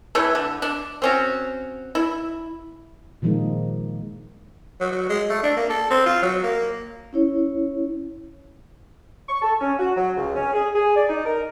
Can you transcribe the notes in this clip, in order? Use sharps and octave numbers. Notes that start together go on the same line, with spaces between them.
E3 A3 E4 C#5
D3
D4
C4 C#4 F#4
E4
A#2 D#3 F3 G#3 A#3 D#4
F#3
F#3
G#3
A3
D4
A#3
A4
C4
F4
F#3
A#3
C#4 E4 C#5
C#6
A4
C#4
F#4
F#3
C#2
C#4
G#4
G#4
D5
D#4
A#4